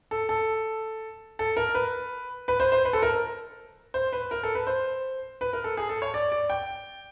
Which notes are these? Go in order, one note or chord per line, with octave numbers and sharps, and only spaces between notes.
A4
A4
A4
A#4
B4
B4
C5
C5
B4
A4
A#4
C5
B4
A#4
A4
B4
C5
B4
A#4
A4
G#4
A4
C#5
D5
D5
G5